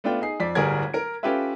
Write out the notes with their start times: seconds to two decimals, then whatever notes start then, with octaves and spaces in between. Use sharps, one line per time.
0.04 A3 B3 D4 F4 G5
0.21 D#4 G#4 C7
0.40 F2 D5 B6
0.55 D1 G1 G3 G#4 A#4 G#6
0.94 A#4 D7
1.23 C#4 F4 G4 A4 B4 E5